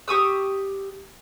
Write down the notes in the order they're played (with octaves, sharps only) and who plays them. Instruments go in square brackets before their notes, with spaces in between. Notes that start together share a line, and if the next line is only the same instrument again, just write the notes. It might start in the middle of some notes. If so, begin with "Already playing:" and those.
[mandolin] G4 C#6 D#6 E6